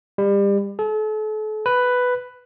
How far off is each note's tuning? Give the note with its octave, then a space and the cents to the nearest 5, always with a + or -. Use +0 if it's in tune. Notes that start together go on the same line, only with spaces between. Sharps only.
G3 +30
A4 -40
B4 +5